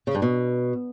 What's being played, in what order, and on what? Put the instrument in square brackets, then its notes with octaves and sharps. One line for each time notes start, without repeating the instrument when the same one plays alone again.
[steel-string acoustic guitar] C#3
G2
B2